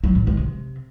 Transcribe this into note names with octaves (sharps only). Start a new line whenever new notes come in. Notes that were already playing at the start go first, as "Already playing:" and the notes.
F#3
A2
G#3
C3